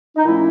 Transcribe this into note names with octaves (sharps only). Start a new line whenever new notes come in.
D#4
A#2 F3 A3 C#4 E4